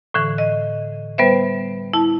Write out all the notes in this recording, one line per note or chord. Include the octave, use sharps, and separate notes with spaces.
A2 D3 E3
D#5
G3 B3 B4 C5 E5
E4 A5